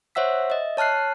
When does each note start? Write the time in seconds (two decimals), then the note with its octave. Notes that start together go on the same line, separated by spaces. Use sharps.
0.15 C5 C#5 E5 F#5 E6 B6
0.50 D#5 E5
0.77 C#5 A5 F6 F#6 C7